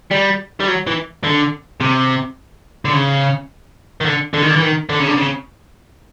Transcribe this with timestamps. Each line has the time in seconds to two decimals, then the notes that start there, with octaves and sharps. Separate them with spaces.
0.11 G3
0.60 G3
0.68 F#3
0.87 E3
1.24 D3
1.80 C3
2.85 D3
2.93 C#3
4.01 D#3
4.05 D3
4.34 D3
4.42 D#3
4.50 D3
4.56 E3
4.62 D#3
4.89 D3
4.99 C#3
5.07 D3
5.17 C#3